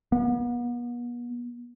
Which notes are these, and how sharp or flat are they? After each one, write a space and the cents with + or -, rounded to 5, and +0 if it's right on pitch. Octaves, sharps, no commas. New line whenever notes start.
B3 -40